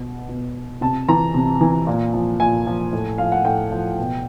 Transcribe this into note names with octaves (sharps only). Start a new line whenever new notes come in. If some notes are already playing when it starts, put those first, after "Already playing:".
Already playing: B2
B2
C3 A5
E3 A#5
C3
E3
A#2
F3
A#2 G#5
F3
A2
F3 F5
F#5
A2 G5
F3
B2